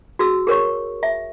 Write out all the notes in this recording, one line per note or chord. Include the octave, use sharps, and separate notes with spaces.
F#4 G#4 E6
G#4 A#4 C#5 C#6
E5